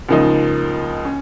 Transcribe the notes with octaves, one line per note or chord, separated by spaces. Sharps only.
C#2 C#3 F3 A#3 D#4
C#4